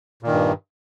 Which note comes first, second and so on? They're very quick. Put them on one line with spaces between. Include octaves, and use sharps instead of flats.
A#2 D#3 G2